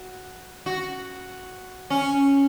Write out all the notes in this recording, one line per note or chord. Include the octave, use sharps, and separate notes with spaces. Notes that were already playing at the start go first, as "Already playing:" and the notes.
Already playing: F#4
F#4
C#4